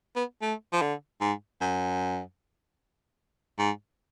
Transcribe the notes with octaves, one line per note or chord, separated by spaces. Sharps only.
B3
A3
F3
D3
G#2
F#2
G#2